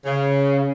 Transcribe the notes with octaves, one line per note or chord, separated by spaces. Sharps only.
C#3